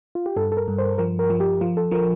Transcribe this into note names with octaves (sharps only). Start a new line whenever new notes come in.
F4
G4
G2 A4
A4
A#4
G2
C5
F3 A#4
A#4
F3
G4
F3 F4
A4
F3 A#4